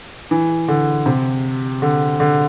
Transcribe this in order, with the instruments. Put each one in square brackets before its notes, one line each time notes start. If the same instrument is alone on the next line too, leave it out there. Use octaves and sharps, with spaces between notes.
[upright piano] E3
D3
C3
D3
D3